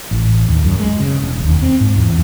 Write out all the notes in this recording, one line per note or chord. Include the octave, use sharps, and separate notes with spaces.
A1
D#2
F#2
G#3
C#3
E1
D#2
C4
G#2
E2